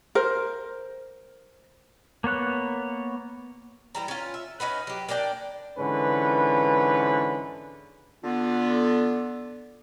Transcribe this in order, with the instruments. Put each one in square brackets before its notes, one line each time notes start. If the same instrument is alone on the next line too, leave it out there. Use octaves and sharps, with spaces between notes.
[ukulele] A#4 C5
[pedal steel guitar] A#3 B3 C#5 F#6
[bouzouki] E3 G3 A#5
C#4 F4
E5
C#4 D#4 F#4 B4
F#3 G4
A#3 D4 D5 G5
[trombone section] G#2 D3 E3 C#4 B4
[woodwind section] D3 B3 F4